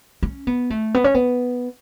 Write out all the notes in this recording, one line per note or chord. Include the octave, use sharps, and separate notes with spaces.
C#4
B3
A3
B3
C#4
B3